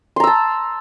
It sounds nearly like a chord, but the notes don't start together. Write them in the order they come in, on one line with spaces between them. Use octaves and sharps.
C6 A#5 E6 A5